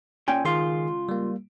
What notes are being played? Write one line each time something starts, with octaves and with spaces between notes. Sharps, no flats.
A#2 C#4 G5 G#5
C#2 D#3 F4 G#4 C6
G3 A#3